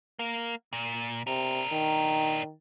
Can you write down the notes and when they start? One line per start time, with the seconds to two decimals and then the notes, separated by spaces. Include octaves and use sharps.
0.19 A#3
0.73 A#2
1.27 C3 D4 A#4
1.72 D#3